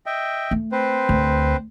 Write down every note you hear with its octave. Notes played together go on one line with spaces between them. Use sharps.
D#5 E5 G5
A3
C4 B4 C5
D2